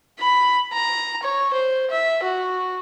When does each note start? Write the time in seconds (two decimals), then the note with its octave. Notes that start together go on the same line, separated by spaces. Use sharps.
0.19 B5
0.73 A#5
1.23 C#5
1.53 C5
1.90 E5
2.23 F#4